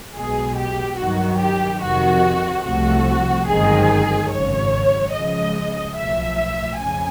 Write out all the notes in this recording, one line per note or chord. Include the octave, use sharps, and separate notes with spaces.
B1 B2 G#3 G#4
G4
G2 D#3 F#3 F#4
G4
F2 C3 D#3 F#4
C2 C3 F3 A3 F#4
G1 F#2 D#3 G#3 C4 G#4
G#1 F#2 C#3 C#5
C#2 C#3 F3 G#3 D#5
B1 A2 F3 E5
F2 C#3 G#5